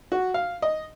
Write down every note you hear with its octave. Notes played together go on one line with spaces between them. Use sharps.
F#4
F5
D#5